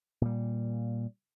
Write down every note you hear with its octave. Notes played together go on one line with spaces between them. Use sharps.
A#2 G3